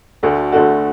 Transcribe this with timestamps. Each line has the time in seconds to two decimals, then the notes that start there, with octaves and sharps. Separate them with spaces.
0.23 D2 D3 A3 F#4
0.52 D2 D3 A3 F#4